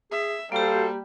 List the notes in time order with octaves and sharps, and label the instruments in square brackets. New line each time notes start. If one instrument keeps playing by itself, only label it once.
[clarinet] G#4 [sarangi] E5
[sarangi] G3 [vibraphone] A#3 G4 [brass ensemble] F#4 A4 C5 [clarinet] F5